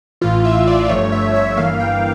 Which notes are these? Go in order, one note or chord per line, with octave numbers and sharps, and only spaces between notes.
A1 A2 E3 F4
E5
D5
G1 G2 F3 A3 C#5
E5
E5
G1 G2 E3 A#3 F5
G5